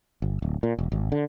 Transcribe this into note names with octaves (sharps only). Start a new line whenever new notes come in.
G1
D1
A#2
E1
G#1
D3